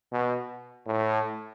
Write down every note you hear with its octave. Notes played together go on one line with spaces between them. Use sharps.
B2
A2